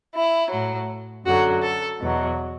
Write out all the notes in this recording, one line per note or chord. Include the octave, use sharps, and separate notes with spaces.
E4
A2 F#3
F#2 D3 F#3 F#4
A4
E2 B2 F#3